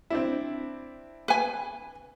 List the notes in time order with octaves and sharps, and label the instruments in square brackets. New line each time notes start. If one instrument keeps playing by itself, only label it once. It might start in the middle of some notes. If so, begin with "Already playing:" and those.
[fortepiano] C4 D4 E4
[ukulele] B4 G#5